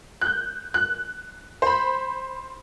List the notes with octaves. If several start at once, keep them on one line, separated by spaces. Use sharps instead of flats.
F#6 G6
F#6
C5 B5